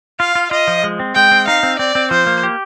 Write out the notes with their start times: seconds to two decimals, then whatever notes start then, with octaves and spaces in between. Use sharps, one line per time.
0.19 F4 F5
0.35 F4
0.51 F4 D#5
0.68 F3
0.84 G#3
1.00 C4
1.15 G#3 G5
1.31 C4
1.47 D#4 F5
1.63 C4
1.79 C4 D5
1.95 C4
2.11 F3 C5
2.27 A#3
2.43 G4